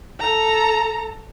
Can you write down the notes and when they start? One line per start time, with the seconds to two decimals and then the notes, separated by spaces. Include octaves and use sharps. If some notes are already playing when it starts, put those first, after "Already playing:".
0.19 A4 A#5